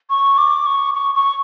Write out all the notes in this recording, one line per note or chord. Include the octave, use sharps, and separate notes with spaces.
C#6
D6
C#6
C#6
C#6